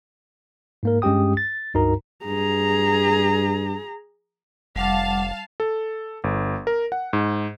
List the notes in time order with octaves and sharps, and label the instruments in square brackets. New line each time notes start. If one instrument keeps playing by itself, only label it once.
[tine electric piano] G#2 A#3 A#4
G2 G#3 C#4 G4 G5 D#6
A6
C#2 G2 D#4 F#4 A#4 A#5
[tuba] G2 [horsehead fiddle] G#4 A#5
[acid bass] F1 [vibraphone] G3 F#5 D6 [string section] F5 A5
[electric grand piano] A4
G1
A#4
F#5
G#2